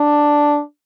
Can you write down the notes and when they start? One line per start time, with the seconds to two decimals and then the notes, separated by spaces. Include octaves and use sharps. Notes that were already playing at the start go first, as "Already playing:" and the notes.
Already playing: D4